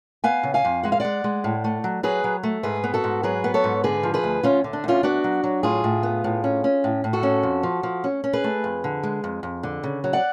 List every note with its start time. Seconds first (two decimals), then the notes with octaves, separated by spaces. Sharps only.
0.24 B3 F5 G#5
0.43 C#3
0.54 F5 G#5
0.65 F2
0.83 G#3 F#5
0.92 F5
1.00 G#3 D5 F#5
1.24 G#3
1.44 A2
1.64 A3
1.84 F#3
2.03 F#3 G#4 B4
2.24 F#3
2.43 A3
2.63 G#2 G#4 B4
2.84 B3
2.94 F#4 A4
3.04 G#2
3.23 F#3 G#4 B4
3.44 B3
3.54 A4 C#5
3.64 G#2
3.84 D3 G#4 B4
4.03 F3
4.14 G#4 B4
4.24 D2
4.43 D2 C#4 F4
4.64 D3
4.73 D4
4.84 D2 C#4 F4
5.03 B3 D4 F#4
5.24 F#3
5.44 F#3
5.63 A2 F4 G#4
5.84 A2
6.03 B3
6.24 A2
6.44 C#4
6.64 C#4
6.84 A2
7.04 A2
7.13 F#4 A4
7.23 C#4
7.43 F2
7.63 F3
7.83 F3
8.04 C#4
8.24 C#4
8.33 G#4 B4
8.44 A3
8.64 F2
8.84 D3
9.03 G#3
9.24 F2
9.43 F2
9.63 D3
9.83 C#3
10.04 F#3
10.13 D5 F#5